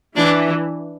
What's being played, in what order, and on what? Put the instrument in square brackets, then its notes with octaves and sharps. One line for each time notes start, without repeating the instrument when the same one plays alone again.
[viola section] E3 [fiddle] D4